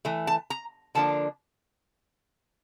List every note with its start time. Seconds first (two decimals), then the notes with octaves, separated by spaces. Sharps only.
0.05 E3 A3
0.27 A5
0.50 A#5
0.95 D3 F3 A#3 D4 A5